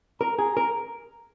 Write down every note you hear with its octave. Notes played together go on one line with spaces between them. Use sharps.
A#4 A#5
G#4
A#4